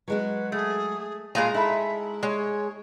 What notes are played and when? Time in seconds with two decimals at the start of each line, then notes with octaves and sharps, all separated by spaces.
0.08 F#3 G#3 F#4 B4
0.52 A3 G#4
1.35 A#2 G#3 A3 F5 G#5 A#5
1.54 D#4 E4 A4 E5
2.23 G#3 C#5